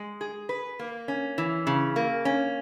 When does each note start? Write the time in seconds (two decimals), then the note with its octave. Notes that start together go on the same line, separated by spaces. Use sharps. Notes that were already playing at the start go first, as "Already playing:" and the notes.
Already playing: G#3
0.21 G#4
0.49 B4
0.79 A#3
1.08 C#4
1.38 E3
1.67 C#3
1.96 A#3
2.25 C#4